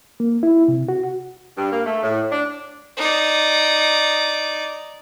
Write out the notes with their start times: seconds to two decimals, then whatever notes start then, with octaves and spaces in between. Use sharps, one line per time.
0.20 A#3
0.43 E4
0.68 C3
0.89 F#4
1.58 G2
1.72 A#3
1.86 A3
2.03 A2
2.32 D4
2.97 D#4 D5